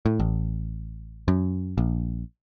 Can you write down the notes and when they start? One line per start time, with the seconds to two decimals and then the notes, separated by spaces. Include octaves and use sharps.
0.06 A2
0.20 A1
1.28 F#2
1.78 A#1